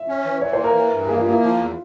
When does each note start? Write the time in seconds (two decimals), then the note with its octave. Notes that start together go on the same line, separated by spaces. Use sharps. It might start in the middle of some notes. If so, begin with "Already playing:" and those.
Already playing: E5
0.08 C#4
0.25 E3
0.41 E3 C#5
0.53 C5
0.59 A#3
0.64 A#4
0.75 E3
0.92 G2
1.03 A#4
1.08 A#3 G#4
1.20 F4
1.25 A#3
1.31 E4
1.42 F3 F4
1.58 E2